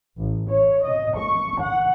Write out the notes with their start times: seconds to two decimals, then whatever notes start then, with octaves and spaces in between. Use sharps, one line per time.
0.17 A1
0.50 C#5
0.84 D#5
1.17 C#6
1.61 F#5